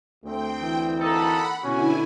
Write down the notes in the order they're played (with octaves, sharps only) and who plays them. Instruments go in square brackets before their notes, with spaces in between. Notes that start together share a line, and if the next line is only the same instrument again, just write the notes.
[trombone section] D2 C4 [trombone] A3 [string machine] G5
[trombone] E3
[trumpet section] A#3 D#4 A4 [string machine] F#5 B5
[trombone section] B2 [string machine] D3 E4 G#5 [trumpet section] C#4 F#4